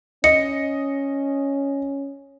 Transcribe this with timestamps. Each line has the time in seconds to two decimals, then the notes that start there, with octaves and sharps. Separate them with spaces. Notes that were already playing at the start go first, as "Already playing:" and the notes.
0.24 C#4 D#5 C#7